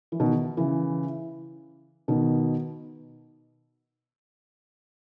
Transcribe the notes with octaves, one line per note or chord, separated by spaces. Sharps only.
E3
B2 D#3
C#3 E3
B2 D#3